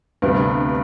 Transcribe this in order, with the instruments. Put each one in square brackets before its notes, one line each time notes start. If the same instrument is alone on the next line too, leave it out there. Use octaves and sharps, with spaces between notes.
[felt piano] D2 C3 G3 B3 D4 [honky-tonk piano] G2